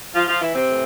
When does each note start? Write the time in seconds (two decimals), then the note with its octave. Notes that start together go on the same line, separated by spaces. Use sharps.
0.14 F3 F4
0.28 F3 F4
0.41 E3 E4
0.55 C3 C4
0.68 A2 E3